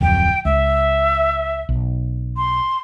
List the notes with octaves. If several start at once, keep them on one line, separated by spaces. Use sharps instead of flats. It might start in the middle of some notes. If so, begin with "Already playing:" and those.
D1 F2 G5
C#2 E5
B1
C6